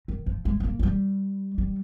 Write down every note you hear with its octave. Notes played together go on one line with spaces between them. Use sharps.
D#3
F3
G#3
G#3
A#3
F3
G3
G3